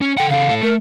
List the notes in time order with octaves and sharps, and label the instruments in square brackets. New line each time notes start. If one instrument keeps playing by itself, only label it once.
[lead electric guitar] C#4
[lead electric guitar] A4 F#5 [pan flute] G5
[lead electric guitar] C#3 A4 [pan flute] F5
[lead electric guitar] A2 A4
[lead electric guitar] A3 [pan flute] A#4